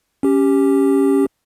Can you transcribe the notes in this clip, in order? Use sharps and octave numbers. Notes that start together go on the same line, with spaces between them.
C#4 G4